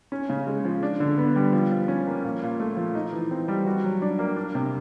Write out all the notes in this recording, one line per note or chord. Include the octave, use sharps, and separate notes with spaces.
C#4
C#3
G#3
F3
D4
D3
B3
G3
F3
F3
C#4
A#3
A#2
A#2
A3
F3
D#4
E3
C4
G3
F#4
F#3
D4
A#3
D4
C3